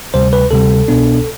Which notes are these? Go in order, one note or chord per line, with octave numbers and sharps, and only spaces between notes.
D2 C3 G3 C5
B4
D2 C3 G3 A4
C2 B2 B3 D4